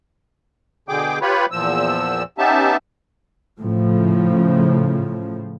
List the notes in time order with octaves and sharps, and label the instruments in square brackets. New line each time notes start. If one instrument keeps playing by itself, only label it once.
[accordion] B2 D3 G#4 G5 D6
F4 G4 B4 C#5 B5
E2 A#2 F3 E6
B3 C#4 D#4 G4 E5 A5
[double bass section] A2 C#3 F3